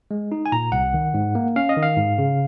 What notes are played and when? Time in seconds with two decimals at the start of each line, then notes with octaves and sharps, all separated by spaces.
0.11 G#3
0.32 D#4
0.46 G#5
0.52 A#2 A#5
0.72 C2 F#5
0.94 D#3
1.14 G#2
1.35 A#3
1.56 C#4 F5
1.69 D#5
1.77 D#3
1.83 F5
1.97 G#2
2.18 C#3